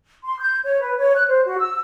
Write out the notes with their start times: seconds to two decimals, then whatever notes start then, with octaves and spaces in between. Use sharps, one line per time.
0.24 C6
0.40 G6
0.64 C#5
0.80 B4
0.97 C#5
1.15 F#6
1.28 C5
1.46 F#4
1.58 E6